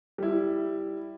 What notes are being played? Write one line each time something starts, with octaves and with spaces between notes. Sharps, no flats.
G3 E4